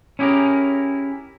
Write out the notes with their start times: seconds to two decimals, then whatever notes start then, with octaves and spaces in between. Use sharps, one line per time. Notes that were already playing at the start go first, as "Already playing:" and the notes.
0.19 C#4 E4 G4 G#4 A#4